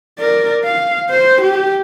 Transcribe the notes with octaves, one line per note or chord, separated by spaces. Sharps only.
A#4 D5
F5
C5
G4